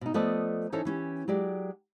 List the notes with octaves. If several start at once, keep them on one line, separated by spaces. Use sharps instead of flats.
B2 D#4
F3 A3 B3 D5 D#5 A5
E3 C#4 D#4 A4 C5 C#5
E3 C#4 G4
F#3 G#3 G4 D5